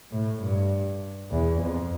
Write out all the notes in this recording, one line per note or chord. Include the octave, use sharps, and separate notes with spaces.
A2
G2
E2
F2